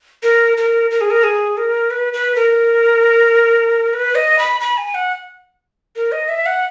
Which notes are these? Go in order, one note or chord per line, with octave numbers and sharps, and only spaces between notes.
A#4
A#4
A#4
G#4
A#4
G#4
A#4
B4
B4
A#4
B4
D#5
B5
B5
G#5
F#5
A#4
D#5
E5
F#5